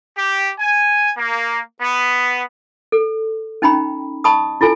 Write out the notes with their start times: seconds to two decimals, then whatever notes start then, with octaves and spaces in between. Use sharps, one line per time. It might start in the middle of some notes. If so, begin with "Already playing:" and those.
0.16 G4
0.60 G#5
1.17 A#3
1.81 B3
2.92 A4
3.62 C#4 D#4 G5 A#5 B5
4.24 D#5 A5 B5 C#6 D#6
4.61 E4 F4 A4 G#5